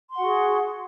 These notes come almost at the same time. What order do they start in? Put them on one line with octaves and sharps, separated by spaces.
C6 F#5 F#4 G#4